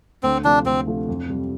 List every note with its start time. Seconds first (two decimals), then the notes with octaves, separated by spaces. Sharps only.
0.23 D2 C4
0.44 C3 F3 A3 D4
0.65 D2 C4
0.87 C3 F3 A3
1.09 F2
1.29 C3 G3